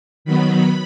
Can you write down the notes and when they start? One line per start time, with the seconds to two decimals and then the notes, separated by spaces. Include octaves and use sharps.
0.25 D#3 F#3 B3 B5